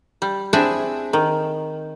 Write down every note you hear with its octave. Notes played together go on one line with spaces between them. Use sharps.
G3
C4 D4 E4 G#4 E5
D#3